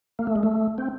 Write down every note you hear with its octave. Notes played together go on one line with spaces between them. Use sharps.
A#3
A3
G#3
A3
C4